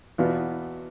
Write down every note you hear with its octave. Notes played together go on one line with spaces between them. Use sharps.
E2 B2 B3 F4